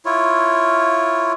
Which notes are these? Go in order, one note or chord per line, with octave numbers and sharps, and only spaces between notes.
E4 F4 C#5